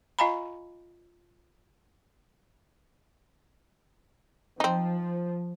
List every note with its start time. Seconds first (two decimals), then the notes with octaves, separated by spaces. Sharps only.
0.19 F4 D#5 F5 G#5 A#5 B5
4.60 F3 C4 D#4